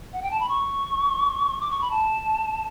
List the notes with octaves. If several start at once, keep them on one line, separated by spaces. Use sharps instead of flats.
F#5
G5
A5
B5
C#6
D6
C#6
B5
A5